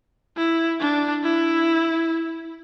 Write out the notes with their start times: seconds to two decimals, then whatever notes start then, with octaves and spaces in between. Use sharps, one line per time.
0.37 E4
0.80 D4
1.24 E4